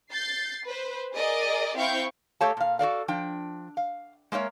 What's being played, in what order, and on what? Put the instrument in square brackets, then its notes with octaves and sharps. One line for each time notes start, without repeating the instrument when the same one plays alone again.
[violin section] G6 A6 C7
B4 C5
G#4 A#4 D5 D#5
C4 E4 F5 G5 C#6 G6
[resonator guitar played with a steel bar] A3 G4 A4 C#5 F5 A5
A#2 F5
F#4 A4 D5 F5
F3 D4 G5
F5
G#3 A#3 A#4 C#5 E5